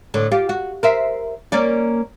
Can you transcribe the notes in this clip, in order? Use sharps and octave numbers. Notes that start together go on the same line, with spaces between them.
A2 D3
F4 G4
F#4
A#4 C5 E5
A#3 C#4 D5